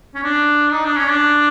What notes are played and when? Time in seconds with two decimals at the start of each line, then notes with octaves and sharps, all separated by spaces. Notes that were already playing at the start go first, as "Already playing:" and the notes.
0.14 C#4
0.23 D4
0.71 D#4
0.85 D4
0.97 C#4
1.10 D4